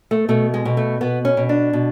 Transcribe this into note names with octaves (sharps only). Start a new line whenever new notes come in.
A3
B2 A3
G#3
B2
A3
B2 B3
C#4
B2
D4
B2